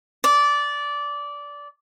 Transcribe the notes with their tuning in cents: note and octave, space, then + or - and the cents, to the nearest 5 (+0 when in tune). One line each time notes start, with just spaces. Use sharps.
D5 -15